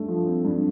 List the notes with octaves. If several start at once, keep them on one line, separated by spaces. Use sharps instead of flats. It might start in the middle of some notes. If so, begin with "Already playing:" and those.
Already playing: G2 A3
F3
C4
G2